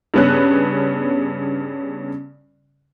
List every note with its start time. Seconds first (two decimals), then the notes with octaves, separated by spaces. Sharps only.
0.14 G2 C#3 B3 C#4 F#6